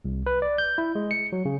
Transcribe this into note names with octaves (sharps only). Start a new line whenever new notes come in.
C2
B4
D5
G6
E4
G#3
C#7
F#3
C#3